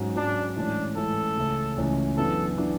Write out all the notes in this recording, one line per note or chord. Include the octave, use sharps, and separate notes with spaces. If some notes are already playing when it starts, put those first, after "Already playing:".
Already playing: G#2 F#3 C#4
G#2 F#3 C#4 D4
A2 E3 G#3 C#4 D4
A2 E3 G#3 C#4 A4
C#2 C#3 E3 A3 C#4
C#2 C#3 E3 A3 C#4
F#2 E3 B3 D4 A4
E3 B3 D4